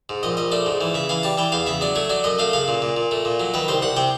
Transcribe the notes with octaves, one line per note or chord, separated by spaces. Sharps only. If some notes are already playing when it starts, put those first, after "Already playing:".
G#2
A#1 D#5
A#1 D#5
A3 D5
G#2
E3
C#3 E5
E3 F5
G3 A5
E3 G5
E2 F5
C#3 E5
F#3 D5
A3 C#5
F#3 D5
F#2 D#5
A3 F5
C#3 F5
A#2
A#2
A#2
A3
A#2
F#3
D#3 B4
C2 C5
C2 F#5
C3 G5